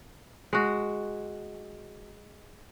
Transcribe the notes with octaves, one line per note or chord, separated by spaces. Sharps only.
G#3 F#4